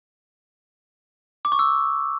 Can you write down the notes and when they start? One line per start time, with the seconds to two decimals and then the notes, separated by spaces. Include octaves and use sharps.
1.45 D6
1.52 C#6
1.59 E6